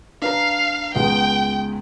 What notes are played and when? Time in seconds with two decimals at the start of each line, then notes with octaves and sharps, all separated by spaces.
0.22 D4 B4 F5 A#5
0.95 C#2 G#3 B3 G5